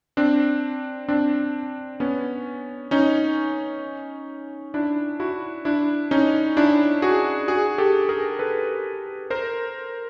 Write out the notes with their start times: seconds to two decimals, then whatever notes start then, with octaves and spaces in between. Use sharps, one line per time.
0.17 C4 D4
1.08 C4 D4
2.00 B3 C#4
2.91 C#4 D#4
4.74 D4 E4
5.20 E4 F#4
5.65 D4 E4
6.11 C#4 D#4
6.57 D4 E4
7.02 F#4 G#4
7.48 F#4 G#4
7.78 G4 A4
8.09 G#4 A#4
8.39 A4 B4
9.30 A#4 C5